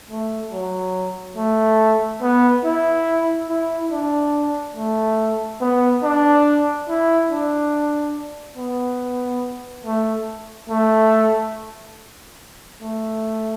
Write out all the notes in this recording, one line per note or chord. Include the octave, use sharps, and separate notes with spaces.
A3
F#3
A3
B3
E4
E4
D4
A3
B3
D4
E4
D4
B3
A3
A3
A3